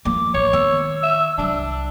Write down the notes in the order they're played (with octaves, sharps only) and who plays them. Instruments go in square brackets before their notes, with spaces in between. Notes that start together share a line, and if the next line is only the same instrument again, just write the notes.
[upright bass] F3 A#3 [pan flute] D6
[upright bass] A1 [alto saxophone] C#5
[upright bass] D#3 B3 [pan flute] E6
[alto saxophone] E5
[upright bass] C2 F#3 [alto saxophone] D4